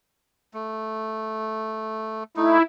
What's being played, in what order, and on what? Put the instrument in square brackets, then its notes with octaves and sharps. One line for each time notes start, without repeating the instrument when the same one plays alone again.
[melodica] A3
[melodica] A3 D#4 [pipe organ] E4